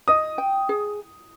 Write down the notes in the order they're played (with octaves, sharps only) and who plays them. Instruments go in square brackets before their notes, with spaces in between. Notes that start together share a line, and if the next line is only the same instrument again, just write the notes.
[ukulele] D#5 [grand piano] D#6
[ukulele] G5
G#4